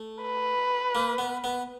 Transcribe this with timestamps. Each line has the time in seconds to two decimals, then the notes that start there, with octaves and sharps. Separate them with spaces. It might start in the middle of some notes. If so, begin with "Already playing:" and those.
Already playing: A3
0.22 B4
0.95 A#3
1.18 B3
1.44 B3